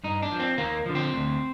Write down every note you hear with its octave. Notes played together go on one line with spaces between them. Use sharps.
G2 D#4
D4
F3
C4
D#2 A#3
D3 F3
C4
D2